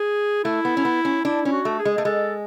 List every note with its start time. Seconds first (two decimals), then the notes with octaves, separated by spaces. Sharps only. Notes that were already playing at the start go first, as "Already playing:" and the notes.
Already playing: G#4
0.44 A3 E4
0.65 B3
0.77 C#4
0.85 B3
1.05 C#4
1.25 D4 E4
1.45 C#4 E4
1.52 F#4
1.65 A3
1.79 G#4
1.85 G#3
1.98 A3
2.05 G#3 A4